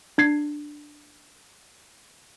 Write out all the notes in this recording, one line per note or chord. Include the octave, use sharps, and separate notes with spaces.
D4 G#6 C7